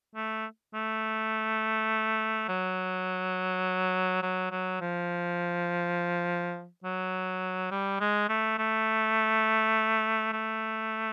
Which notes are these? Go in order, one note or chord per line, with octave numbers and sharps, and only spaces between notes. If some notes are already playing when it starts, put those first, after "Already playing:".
A3
A3
F#3
F#3
F#3
F3
F#3
G3
G#3
A3
A3
A3